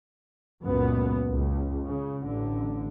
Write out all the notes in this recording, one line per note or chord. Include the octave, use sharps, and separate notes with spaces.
C#2 F#2 A#2 B3
C#2
C#3
A1 D3